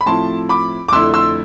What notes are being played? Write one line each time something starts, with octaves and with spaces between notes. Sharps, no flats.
B5
A2 F3 C4 E4 A5 C6
B5 D6
D6
F2 D3 A3 E4 C6 E6
C6 E6